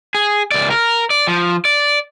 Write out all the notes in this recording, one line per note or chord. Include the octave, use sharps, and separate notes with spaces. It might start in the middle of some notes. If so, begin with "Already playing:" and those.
G#4
C#2 D5
A#4
D5
F3
D5